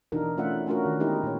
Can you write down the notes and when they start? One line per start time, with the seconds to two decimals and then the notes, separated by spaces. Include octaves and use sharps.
0.12 B2 E3 D4 D#4 A#4
0.37 A3 C#4 F4 D5 E5 F#5
0.66 A3 C#4 D4 F4 F#4 A#4
0.86 D#3
1.00 G#3 B3 D#4 E4 G4 A#4
1.23 A#2 C#5